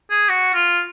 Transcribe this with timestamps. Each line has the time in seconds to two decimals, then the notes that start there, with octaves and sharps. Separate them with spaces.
0.10 G#4
0.29 F#4
0.54 F4